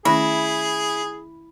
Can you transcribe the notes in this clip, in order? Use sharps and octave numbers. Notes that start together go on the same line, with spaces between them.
D#3 A3 C#4 E4 G#4 E5 B5